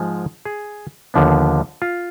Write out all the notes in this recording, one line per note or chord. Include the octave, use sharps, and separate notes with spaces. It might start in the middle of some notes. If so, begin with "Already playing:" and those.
Already playing: G#2 F3 G#3
G#4
D#2 D3 F3 B3
F4